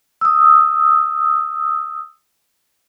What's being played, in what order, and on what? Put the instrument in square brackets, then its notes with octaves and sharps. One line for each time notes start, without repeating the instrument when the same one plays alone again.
[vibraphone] D#6 E6